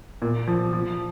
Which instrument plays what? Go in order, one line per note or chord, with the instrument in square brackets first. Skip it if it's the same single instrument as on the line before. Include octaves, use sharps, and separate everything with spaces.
[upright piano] A#2
F3
F3